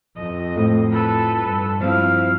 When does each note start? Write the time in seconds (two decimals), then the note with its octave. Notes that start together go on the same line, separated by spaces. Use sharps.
0.16 F2 D#5
0.56 A2 F3
0.90 A4 B4
1.39 G2
1.80 F3 C4 E4 F5